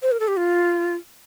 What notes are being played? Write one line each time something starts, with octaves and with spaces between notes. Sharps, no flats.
C5
A#4
A4
G4
F4